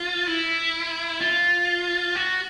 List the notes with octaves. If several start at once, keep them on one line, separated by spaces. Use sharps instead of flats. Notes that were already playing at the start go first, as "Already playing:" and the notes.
Already playing: F4
E4
F4
F#4